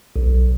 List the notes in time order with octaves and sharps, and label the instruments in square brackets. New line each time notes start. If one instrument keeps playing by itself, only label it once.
[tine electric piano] B1